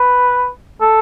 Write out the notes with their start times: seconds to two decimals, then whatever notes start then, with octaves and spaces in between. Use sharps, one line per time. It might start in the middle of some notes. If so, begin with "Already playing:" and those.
Already playing: B4
0.81 A4